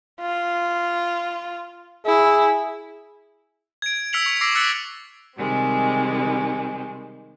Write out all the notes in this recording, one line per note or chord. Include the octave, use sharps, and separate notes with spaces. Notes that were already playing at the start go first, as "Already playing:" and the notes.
F4
E4 G#4
G#6 D7
E6 F6 B6 C#7 F7 F#7
C#6 D7
C#6 D6 E6 A#6 C7 D7
E6 F#6 A6 B6 C#7 F#7
C3 D#3 G3 G#3 C4